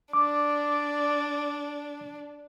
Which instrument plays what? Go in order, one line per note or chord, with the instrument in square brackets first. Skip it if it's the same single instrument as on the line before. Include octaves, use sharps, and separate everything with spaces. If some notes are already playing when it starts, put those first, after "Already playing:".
[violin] D4 [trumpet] D5 [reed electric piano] D6